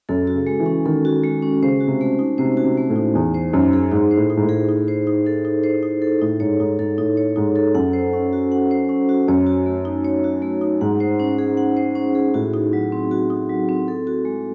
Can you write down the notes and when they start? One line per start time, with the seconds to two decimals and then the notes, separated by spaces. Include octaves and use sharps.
0.09 F#2 A4
0.27 F#4
0.34 C#3
0.47 G#3
0.60 E3
0.66 C#4
0.85 D#3 A4
1.05 F#4
1.23 G#3
1.42 C#4
1.62 C#3 C5
1.81 F#4
1.88 C3
2.01 A3
2.19 D#4
2.38 C3 C5
2.57 F#4
2.64 C3
2.77 A3
2.90 A2
2.96 D#4
3.15 E2 D#4
3.34 C5
3.53 F#2 D#4
3.73 G#4
3.91 G#2 D#4
4.11 C5
4.17 A2
4.30 D#4
4.37 G#2
4.43 A2
4.49 G#4
4.69 D#4
4.88 C5
5.07 D#4
5.26 A4
5.45 D#4
5.63 C5
5.83 D#4
6.02 A4
6.21 A2 D#4
6.40 G#2 C#5
6.60 G#2 D#4
6.79 G#2 A4
6.98 A2 D#4
7.17 C#5
7.36 G#2 D#4
7.56 A4
7.75 F#2 F#5
7.93 C5
8.13 C#4
8.33 F#4
8.52 F#5
8.71 C5
8.89 C#4
9.09 F#4
9.28 F#2 C#5
9.46 F#4
9.66 A3
9.85 D#4
10.05 C#5
10.24 F#4
10.42 A3
10.61 D#4
10.81 G#2 F#5
11.00 C5
11.19 C#4
11.38 G#4
11.57 F#5
11.77 C5
11.95 C#4
12.15 G#4
12.34 A2 F#4
12.54 D#4
12.73 F#3
12.92 C4
13.11 F#4
13.30 D#4
13.49 F#3
13.69 C4
13.88 A4
14.07 F#4
14.25 G#3